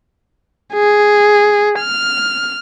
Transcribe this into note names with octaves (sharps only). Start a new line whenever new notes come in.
G#4
F6